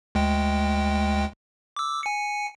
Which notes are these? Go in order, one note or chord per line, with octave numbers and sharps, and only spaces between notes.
D2 G#3 G5
D6 E6
G#5 C#7